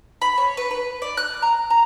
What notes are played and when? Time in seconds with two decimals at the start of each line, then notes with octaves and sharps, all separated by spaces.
0.22 B5
0.37 C#5
0.57 B4
0.71 B4
1.02 D5
1.17 F#6
1.42 A#5
1.70 A#5